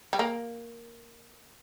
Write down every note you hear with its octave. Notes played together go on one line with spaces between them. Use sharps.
G3
A#3